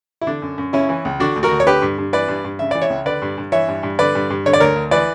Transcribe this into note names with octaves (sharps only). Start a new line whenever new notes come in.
E4
D3 D4
F#2
F#2
C#3 C#4 E4
E3
C#2
D3 D4 F#4
D2
F#4 A#4
D2
C#5
D3 G4 B4
G2
G2
E3 B4 D5
G2
G2
C#3 E5
E3 D5
C#5 E5
C#2
D3 B4 D5
G2
G2
E3 C#5 E5
G2
G2
D3 B4 D5
G2
G2
D3 C#5
D5
D2 A#4 C#5
D2
E3 B4 D5